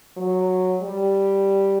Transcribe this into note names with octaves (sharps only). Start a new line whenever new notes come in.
F#3
G3